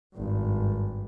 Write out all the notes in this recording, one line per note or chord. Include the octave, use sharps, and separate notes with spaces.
G#1 G2